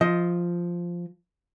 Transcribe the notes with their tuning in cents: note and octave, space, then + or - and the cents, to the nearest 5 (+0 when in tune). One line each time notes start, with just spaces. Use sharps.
F3 -5 D#5 +15